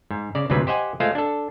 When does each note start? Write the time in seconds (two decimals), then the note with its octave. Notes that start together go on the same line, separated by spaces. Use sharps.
0.11 G#2
0.35 C#3 D5
0.50 D2 G#2 C3 F#3 B4
0.67 G4 C5 D#5 F#5 G#5
1.00 G#3 A3 F4 C5 F5
1.15 D4 A4